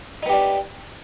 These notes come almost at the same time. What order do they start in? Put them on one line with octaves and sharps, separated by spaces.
D#4 B3 G4 D4